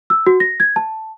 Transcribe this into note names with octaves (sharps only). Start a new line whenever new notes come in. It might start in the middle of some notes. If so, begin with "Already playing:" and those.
E6
F#4
A#6
G#6
A5